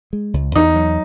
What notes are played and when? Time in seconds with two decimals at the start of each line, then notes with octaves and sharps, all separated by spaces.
0.13 G#3
0.34 C#2
0.55 E2 D#4
0.76 F#3